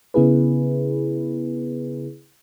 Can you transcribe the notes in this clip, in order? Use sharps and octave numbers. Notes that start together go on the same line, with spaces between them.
C#3 B3 E4 G#4 B4